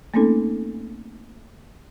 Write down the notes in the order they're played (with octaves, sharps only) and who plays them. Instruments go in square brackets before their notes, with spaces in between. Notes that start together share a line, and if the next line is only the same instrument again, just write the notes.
[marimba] A3 A#3 C4 C#4 D#4 A4